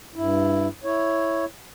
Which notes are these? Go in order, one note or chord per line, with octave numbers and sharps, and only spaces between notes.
G2 E4
E4 C#5